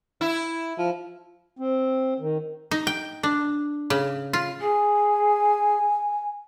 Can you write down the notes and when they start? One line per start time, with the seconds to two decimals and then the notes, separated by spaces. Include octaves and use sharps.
0.21 E4
0.78 F3
1.59 C4
2.20 D#3
2.71 D#4
2.87 G5
3.23 D4
3.90 C#3
4.33 F4
4.60 G#4 G#5